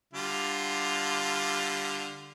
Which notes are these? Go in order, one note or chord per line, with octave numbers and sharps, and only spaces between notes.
D3 G3 F4